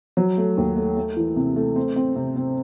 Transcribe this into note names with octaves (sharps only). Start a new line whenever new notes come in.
F#3
A3
D#2
A3
A3
E3
C3
A3
C4
C4
C3
C4